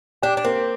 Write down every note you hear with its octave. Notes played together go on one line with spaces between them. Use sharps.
D4 G4
D4
A#3 C4